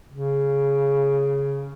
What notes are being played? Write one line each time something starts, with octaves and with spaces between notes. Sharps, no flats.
C#3